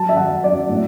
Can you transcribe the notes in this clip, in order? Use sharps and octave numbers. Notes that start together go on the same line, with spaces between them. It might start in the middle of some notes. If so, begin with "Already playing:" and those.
Already playing: F#3 A5
E5
F#3 F#5
F#3 D5
A2